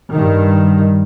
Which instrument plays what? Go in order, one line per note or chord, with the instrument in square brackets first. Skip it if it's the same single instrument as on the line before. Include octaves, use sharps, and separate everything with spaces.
[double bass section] G2 D#3